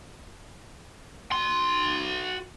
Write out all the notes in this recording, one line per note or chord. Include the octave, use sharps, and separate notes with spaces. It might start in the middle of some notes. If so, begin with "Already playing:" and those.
F#4 C6